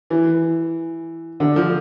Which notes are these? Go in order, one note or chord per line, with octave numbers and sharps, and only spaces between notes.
E3
D3
F3